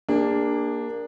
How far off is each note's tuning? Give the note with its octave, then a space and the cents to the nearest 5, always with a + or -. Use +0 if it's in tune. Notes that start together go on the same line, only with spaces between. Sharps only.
A#3 +0 D4 +0 G#4 -40